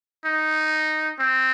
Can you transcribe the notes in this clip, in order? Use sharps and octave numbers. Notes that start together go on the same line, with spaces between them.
D#4
C4